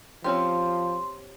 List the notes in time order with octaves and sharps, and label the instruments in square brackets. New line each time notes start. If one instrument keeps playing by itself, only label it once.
[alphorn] F3 [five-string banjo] C4 C#4 G4 [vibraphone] C6